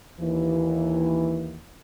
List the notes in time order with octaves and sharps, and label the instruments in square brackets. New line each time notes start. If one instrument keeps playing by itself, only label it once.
[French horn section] D#2 E3